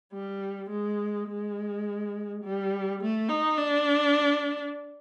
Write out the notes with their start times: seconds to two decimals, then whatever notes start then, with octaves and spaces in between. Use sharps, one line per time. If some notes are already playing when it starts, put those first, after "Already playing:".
0.13 G3
0.70 G#3
1.28 G#3
2.43 G3
3.01 A3
3.29 D#4
3.58 D4